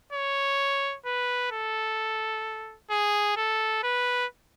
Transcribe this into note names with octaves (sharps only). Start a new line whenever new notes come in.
C#5
B4
A4
G#4
A4
B4